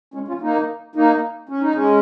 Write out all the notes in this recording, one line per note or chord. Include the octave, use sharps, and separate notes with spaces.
G#3 C#4
C#4 F4
A#3 D#4
A#3 D#4
C#4
D#4
G#3 C#4